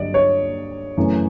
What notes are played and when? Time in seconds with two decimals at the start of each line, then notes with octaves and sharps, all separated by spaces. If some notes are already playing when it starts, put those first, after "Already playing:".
Already playing: G2 D3 F#3 D5 D#5
0.14 C#5
0.97 F#2 C#3 E3 A3